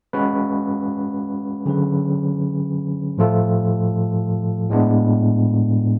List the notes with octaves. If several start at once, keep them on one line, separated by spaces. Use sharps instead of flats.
G#3 C#4 F#4 B4
D3 F#3 C#4 G#4 B4
A2 F3 A3 F4 A4
A2 G#3 B3 D4